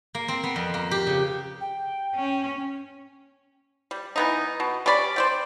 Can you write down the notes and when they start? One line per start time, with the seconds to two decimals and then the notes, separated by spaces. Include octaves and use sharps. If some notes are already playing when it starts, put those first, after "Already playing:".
0.15 A#3
0.28 C4
0.44 B3
0.56 F2
0.74 A#3
0.91 G4
1.07 C#3
1.61 G5
2.15 C#4
3.91 G3
4.16 E3 B3 D#4
4.60 B2
4.86 G3 C#4 D5 B5
5.16 C5 D5 G5